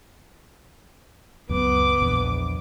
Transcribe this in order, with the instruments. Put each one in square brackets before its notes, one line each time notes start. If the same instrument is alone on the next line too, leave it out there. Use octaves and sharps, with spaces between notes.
[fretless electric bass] C#2 F#2 [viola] B3 D6
[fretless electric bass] A#1 E2